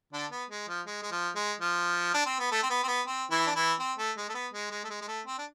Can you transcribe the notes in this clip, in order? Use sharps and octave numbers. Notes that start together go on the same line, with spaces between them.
D3 D4
B3
G#3
F3
G#3
G#3
F3
G#3
F3
D4
C4
B3
A3
C4
B3
C4
B3
C4
E3 E4
D4
E3 E4
C4
A3
G#3
A3
B3
G#3
G#3
A3
G#3
G#3
A3
C4
D4